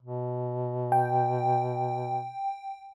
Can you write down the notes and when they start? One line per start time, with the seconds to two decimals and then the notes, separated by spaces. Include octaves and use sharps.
0.02 B2
0.92 G5